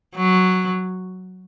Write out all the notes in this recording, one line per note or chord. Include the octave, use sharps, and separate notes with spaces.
F#3